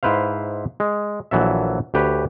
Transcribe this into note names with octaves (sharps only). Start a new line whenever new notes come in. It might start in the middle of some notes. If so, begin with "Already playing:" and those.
G#2 E4 B4 C5 F5
G#3
A#1 E3 F#3 A4 E5
D2 G4 B4 C#5